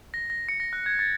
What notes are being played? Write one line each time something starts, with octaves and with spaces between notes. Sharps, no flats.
A#6
A#6
C#7
A#6
F#6
G#6
A6